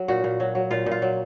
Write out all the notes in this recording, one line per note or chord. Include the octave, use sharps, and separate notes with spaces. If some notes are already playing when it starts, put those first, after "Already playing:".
Already playing: F#3
A#2 F#4
A#2
F#3
F#3
A#2 F4
A#2
F4
F#3